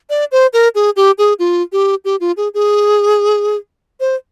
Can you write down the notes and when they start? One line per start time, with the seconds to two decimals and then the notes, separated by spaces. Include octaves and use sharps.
0.10 D5
0.32 C5
0.53 A#4
0.75 G#4
0.96 G4
1.18 G#4
1.39 F4
1.72 G4
2.05 G4
2.20 F4
2.37 G#4
2.54 G#4
4.00 C5